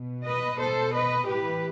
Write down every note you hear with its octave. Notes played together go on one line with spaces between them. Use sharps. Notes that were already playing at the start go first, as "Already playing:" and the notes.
Already playing: B2
B4 D#5
B2 A4 C5
B4 D#5
A2 E3 G4 B4